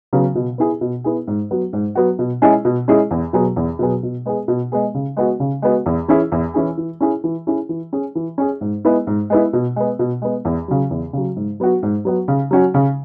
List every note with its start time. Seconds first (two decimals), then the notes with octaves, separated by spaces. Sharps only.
0.13 C#3 F#3 B3
0.35 B2
0.58 B3 E4 G#4
0.81 B2
1.04 B3 E4 G#4
1.27 G#2
1.51 F#3 B3 F#4
1.73 G#2
1.95 F#3 B3 F#4
2.19 B2
2.42 G#3 C#4 E4 G#4
2.65 B2
2.88 G#3 C#4 E4 G#4
3.11 E2
3.33 B2 F#3 B3 G#4
3.56 E2
3.79 B2 F#3 B3 G#4
4.03 B2
4.26 G#3 B3 G#4
4.48 B2
4.72 G#3 B3 G#4
4.94 C#3
5.17 G#3 B3 F#4
5.40 C#3
5.62 G#3 B3 F#4
5.86 E2
6.08 E3 C#4 E4 G#4
6.32 E2
6.54 E3 C#4 E4 G#4
6.78 E3
7.00 C#4 E4 G#4
7.24 E3
7.47 C#4 E4 G#4
7.69 E3
7.93 C#4 G#4
8.15 E3
8.38 C#4 G#4
8.61 G#2
8.85 G#3 B3 E4
9.07 G#2
9.30 G#3 B3 E4
9.53 B2
9.76 G#3 B3
9.99 B2
10.22 G#3 B3
10.45 E2
10.68 C#3 F#3
10.91 E2
11.13 C#3 F#3
11.36 G#2
11.60 F#3 B3 F#4
11.83 G#2
12.05 F#3 B3 F#4
12.28 C#3
12.51 F#3 C#4 F#4
12.74 C#3